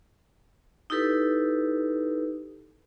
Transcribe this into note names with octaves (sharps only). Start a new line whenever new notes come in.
D#4 E4 G4 A4 B4